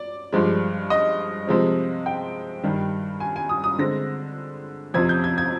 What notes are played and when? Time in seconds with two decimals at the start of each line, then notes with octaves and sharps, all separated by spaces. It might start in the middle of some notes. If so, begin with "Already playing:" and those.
Already playing: D5
0.33 G2 F3 G#3
0.90 D#5
1.47 C3 F3 G#3 C4
2.06 G5
2.63 G2 D#3 G3
3.20 G#5
3.36 G#5
3.49 D#6
3.64 D#6
3.78 D3 G#3 C4 A#6
4.94 F2 C3 F3 C4 G#6
5.09 G6
5.24 G#6
5.38 G#6